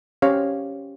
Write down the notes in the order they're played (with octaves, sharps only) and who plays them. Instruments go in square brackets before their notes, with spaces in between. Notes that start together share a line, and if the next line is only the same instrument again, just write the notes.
[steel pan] C#4 G4 C5 C#5 F5